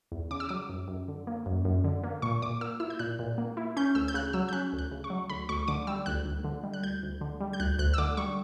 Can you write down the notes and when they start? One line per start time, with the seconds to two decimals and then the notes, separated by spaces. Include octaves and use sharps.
0.12 E2
0.31 C#3 D6
0.40 E6
0.49 F#3 D6
0.69 F#2
0.88 F#2
1.08 D3
1.27 A#3
1.46 F#2
1.65 F#2
1.84 D3
2.04 A#3
2.22 A#2 C#6
2.42 A#2 D6
2.61 A#3 E6
2.80 E4 E6
2.90 G6
2.99 A#2 F#6
3.19 A#2
3.38 A#3
3.57 E4
3.77 C#4 G6
3.95 D2 E6
4.08 G6
4.14 C#3 F#6
4.33 F#3 E6
4.49 G6
4.53 C#4 F#6
4.73 D2
4.79 F#6
4.92 C#3
5.04 C#6
5.10 F#3
5.30 D2 B5
5.49 D2 C#6
5.68 D3 D6
5.87 G3 E6
6.06 D2 F#6
6.26 D2
6.44 D3
6.64 G3
6.74 F#6
6.83 D2 G6
7.03 D2
7.21 D3
7.40 G3
7.53 G6
7.60 D2 F#6
7.79 D2 F#6
7.94 E6
7.98 D3 D6
8.17 G3 C#6